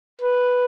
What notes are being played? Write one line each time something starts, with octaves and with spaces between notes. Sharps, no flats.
B4